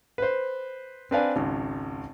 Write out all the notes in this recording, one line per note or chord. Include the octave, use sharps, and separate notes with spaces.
B4 C5
C4 D4 B4 D5 F5 G#5
G#1 C#2